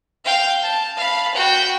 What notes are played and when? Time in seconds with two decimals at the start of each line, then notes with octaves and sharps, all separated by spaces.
0.25 F5 G5
0.63 A5
0.97 F5 B5
1.34 F#4 G5